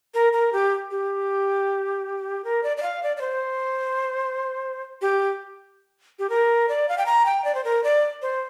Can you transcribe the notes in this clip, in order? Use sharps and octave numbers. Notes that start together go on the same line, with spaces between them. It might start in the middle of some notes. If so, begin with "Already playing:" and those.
A#4
A#4
G4
G4
A#4
D5
D5
F5
D5
D5
C5
G4
G4
A#4
D5
F5
G5
A#5
G5
D5
C5
A#4
D5
C5